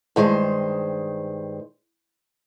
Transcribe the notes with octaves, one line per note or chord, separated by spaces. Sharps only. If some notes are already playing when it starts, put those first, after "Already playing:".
G2 D#3 G#3 C5